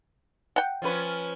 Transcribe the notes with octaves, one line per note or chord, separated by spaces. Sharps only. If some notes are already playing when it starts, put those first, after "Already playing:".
F#5 G5
F3 C#4 B4